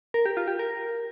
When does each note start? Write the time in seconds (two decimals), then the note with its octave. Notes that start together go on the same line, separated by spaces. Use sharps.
0.14 A#4
0.26 G4
0.37 F4
0.47 G4
0.59 A#4